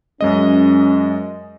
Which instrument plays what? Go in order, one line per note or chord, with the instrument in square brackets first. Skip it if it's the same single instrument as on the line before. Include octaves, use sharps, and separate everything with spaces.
[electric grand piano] F#2 G#3 D#5 [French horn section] C#4